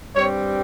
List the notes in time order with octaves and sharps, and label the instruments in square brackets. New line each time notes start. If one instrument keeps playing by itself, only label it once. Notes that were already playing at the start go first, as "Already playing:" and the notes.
[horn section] G2 G3 C4 C#5